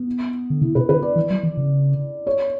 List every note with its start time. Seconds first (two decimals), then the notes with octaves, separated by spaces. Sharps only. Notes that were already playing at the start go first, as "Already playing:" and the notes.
Already playing: B3
0.50 D3
0.61 C#3 E4
0.75 B2 B4
0.89 D3 B4
1.02 D5
1.16 E3
1.31 F#3
1.43 E3
1.57 C#3
2.27 C#5